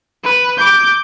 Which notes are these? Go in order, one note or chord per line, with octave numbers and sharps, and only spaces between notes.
B4
D6 G6